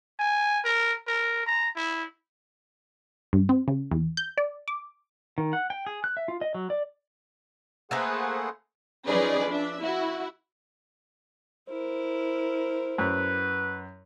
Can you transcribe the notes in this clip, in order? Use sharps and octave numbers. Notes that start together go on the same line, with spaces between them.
G#5
A#4
A#4
A#5
E4
G2
C4
C#3
E2
G6
D5
D6
D#3
F#5
G5
G#4
F#6
E5
F4
D#5
F#3
D5
A3 A#3 G#4 B4 C5 F#5
F3 C#4 D#4 G#4 B4 D5
D4 E5
E4 F#4
E4 A#4 C5
F#2 B4